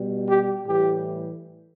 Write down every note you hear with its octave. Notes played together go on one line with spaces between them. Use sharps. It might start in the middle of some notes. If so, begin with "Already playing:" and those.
Already playing: B2 G3
G4
A2 E3 G3 G4